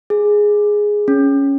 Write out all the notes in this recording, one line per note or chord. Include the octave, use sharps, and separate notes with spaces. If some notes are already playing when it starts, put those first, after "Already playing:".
G#4
C#4